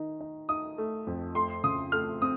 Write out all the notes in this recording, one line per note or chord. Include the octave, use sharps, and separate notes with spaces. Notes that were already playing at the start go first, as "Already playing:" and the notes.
Already playing: D#3 D#4
D#4
D#4 D#6
A3
F2
A3 C6
C#3 D#6
A3 F6
C4 D#6